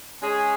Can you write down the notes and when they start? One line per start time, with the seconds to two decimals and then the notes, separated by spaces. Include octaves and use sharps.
0.20 G#3 C#4 G#4